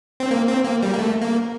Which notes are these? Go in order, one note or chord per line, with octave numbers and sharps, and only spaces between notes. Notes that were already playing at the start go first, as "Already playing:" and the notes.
C4
A#3
C4
A#3
G3
A#3
A3
A#3